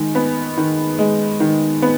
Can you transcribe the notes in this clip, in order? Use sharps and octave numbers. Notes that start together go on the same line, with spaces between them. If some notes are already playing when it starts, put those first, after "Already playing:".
Already playing: D#3 G#3
B3
D#3
G#3
D#3
B3